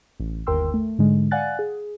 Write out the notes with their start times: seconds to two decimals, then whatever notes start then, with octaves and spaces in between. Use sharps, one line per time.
0.20 A1
0.47 G1 D#2 A#4 G5 C6 E6
0.74 A3
0.98 G#2 D3 G#3
1.31 D5 F5 F#5 G#5 F#6 A6
1.59 G#4